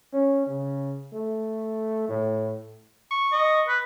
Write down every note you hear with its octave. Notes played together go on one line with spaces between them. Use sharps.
C#4
C#3
A3
A2
C#6
D#5
B4